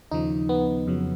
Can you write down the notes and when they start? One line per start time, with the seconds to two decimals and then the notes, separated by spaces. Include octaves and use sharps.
0.11 D#2 C#3 F3 D#4
0.49 B3
0.87 F2 C#3 F#3